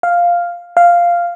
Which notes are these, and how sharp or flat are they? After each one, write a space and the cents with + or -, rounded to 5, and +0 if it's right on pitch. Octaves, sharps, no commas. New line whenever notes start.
F5 +0
F5 -5